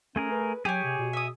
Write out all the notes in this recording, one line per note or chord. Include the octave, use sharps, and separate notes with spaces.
A3 C#4 G#4 A#4
B4
F#3 G4 G#4 C#5 G#5
C3
B2
E5 D#6